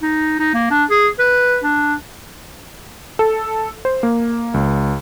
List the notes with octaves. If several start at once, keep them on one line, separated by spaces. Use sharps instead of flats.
D#4
D#4
A#3
D4
G#4
B4
D4
A4
C5
A#3
C#2